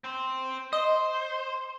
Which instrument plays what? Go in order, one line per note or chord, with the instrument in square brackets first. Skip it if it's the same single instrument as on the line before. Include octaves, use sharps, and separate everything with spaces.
[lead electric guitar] C4 C5
[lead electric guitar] C5 [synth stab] D#5